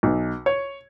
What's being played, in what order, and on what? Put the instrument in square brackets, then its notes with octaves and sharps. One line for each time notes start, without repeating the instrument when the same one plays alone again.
[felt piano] B1
C#5